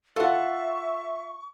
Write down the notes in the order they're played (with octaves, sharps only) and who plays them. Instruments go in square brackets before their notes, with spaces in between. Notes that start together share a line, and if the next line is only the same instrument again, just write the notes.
[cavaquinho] F4 F#5 [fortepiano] A4 [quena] E5 [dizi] C#6